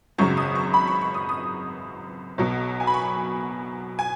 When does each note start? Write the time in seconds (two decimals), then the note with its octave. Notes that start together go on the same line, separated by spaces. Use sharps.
0.18 G#1 F#2 C#3 F#3 C#6
0.37 D#6
0.55 C#6
0.74 B5
0.87 C#6
1.01 C#6
1.14 D#6
1.29 D#6
2.38 B1 B2 F#3
2.80 G#5
2.87 B5
2.94 C#6
3.99 G#5